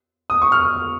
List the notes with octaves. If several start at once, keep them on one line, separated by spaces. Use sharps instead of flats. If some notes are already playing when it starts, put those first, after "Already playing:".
D#6
C#6
F6